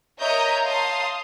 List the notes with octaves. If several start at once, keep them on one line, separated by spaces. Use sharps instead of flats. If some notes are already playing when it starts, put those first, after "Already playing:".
A#4 C#5 D#5 E5 A#5 G6
F5 A5 C6 D#6